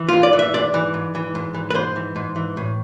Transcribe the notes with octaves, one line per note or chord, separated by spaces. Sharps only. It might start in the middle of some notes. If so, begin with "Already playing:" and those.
Already playing: E3
G#2 F4
D5
E3
E5
G#2 D5
E3
G#2
E3
G#2
E3
B4
G#2 C5
E3
G#2
E3
A2